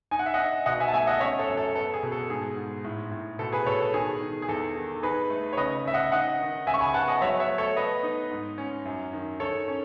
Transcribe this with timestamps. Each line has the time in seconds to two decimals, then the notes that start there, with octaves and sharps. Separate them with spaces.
0.11 D#4 G#5
0.19 F#5
0.26 E5
0.34 D#5 F#5
0.39 D#4
0.66 B2 D#5 F#5
0.80 E5 G#5
0.88 A5
0.93 A3 E5 G#5
1.07 D#5 F#5
1.20 C#4 C#5 E5
1.39 A4 C#5
1.48 F#2
1.57 A4
1.75 B3 A4
1.94 G#4
2.03 B2
2.12 A4
2.30 G#2 G#4
2.57 G#2
2.84 A2
3.11 A2
3.39 B2 A4
3.52 G#4 B4
3.66 B2 A4 C#5
3.80 A4
3.93 D#3 G#4
4.21 D#3
4.42 G#4
4.48 E2 A4
4.76 D#3
5.03 D#4 G#4 B4
5.30 A3
5.53 C#5
5.57 C#3 B4 D#5
5.85 C#3 E5
5.94 D#5 F#5
6.12 D#4 D#5 F#5
6.39 D#3
6.67 C#3 E5 G#5
6.74 C#6
6.81 G#5 B5
6.94 B3 F#5 A5
7.08 D#5 F#5
7.22 F#3 C#5 E5
7.40 C#5 E5
7.49 A3
7.58 A4 C#5
7.76 B3 B4 D#5
8.03 D#4
8.31 G#2
8.58 C#4
8.85 F#2
9.13 D#3
9.40 D#3 A4 C#5
9.68 C#4